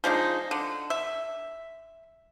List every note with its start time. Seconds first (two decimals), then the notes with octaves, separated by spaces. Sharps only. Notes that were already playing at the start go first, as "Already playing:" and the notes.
0.04 F3 G#3 D4 D#4
0.51 D3
0.90 E5